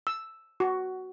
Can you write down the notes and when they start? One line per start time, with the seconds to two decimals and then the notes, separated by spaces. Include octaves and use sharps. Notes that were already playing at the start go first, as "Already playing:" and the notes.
0.07 E6
0.60 F#4